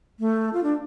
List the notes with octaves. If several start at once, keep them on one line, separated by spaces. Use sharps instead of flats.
A3
F4
D4